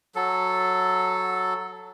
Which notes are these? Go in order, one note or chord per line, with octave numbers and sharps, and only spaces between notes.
F#3 A4